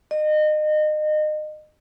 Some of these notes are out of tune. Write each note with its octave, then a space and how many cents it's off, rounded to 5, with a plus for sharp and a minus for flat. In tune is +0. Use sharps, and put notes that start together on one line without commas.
D#5 -30